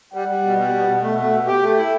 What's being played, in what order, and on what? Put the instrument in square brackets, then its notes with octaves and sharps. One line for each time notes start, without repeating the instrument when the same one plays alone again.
[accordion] G3 [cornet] F#5
[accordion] G3
B2
G3
B2
B2
[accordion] A3 [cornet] F#5
[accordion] A3
B2
[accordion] G4 [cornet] G5
[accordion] A3
E4